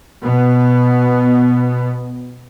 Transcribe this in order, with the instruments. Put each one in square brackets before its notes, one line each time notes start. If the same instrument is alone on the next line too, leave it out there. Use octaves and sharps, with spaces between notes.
[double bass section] B2 B3